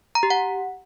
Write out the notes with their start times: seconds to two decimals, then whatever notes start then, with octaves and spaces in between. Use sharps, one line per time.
0.15 A#5
0.23 G4
0.30 F#5